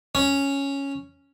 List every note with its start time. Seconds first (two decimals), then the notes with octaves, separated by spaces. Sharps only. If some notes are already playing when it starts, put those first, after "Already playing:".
0.15 C#4